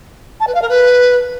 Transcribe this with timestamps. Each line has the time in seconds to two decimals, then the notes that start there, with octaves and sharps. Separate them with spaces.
0.40 A5
0.47 B4
0.54 F5
0.61 A#4
0.69 B4